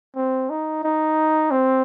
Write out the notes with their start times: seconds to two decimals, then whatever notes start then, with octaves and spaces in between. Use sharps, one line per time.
0.15 C4
0.50 D#4
0.83 D#4
1.51 C4